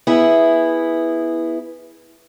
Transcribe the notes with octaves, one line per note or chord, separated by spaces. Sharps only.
B3 E4 G#4